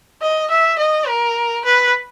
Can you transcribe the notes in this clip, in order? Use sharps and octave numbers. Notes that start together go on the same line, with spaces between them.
D#5
E5
D#5
A#4
B4